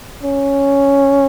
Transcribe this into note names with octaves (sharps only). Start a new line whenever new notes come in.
C#4